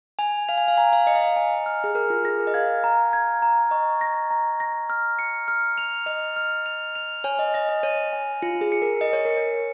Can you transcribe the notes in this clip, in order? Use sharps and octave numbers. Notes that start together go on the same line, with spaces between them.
G#5 F7
F5 F7
G#5
F5
G#5 A#5
F5
D#5 C#7
F5
D#5
G#5
F6
G#4
A#4 F6
F4
G#4 A#6
A#4
D#5
F5 G#6
A#5
G#6
A#5
D#5 C#6
A#6
A#5
A#6
F6
C#7
F6
F7
D#5 F7
F6
F7
F7
C#5 G#5
D#5
D#5 A#6
D#5
C#5 D#7
G#5
F4 C#7
G#4
C#7
A#4
D#5 C#7
C#5
A#4 C#7
C#5